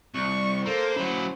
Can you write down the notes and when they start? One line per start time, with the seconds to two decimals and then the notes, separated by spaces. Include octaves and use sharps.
0.15 C2 C#6
0.66 A#3 A4 C5
0.96 F#3 C#4 E4